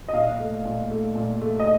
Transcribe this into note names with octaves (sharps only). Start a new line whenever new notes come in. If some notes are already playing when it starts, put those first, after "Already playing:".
D#5
A#2 F5
A3
A#2
A3
A#2
A3
D#5